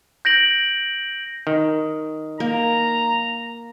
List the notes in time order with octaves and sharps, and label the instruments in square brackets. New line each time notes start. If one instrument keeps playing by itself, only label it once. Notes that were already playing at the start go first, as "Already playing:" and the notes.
[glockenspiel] G6 A#6 D7 F#7
[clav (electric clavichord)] D#3
[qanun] A#3 [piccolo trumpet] A#5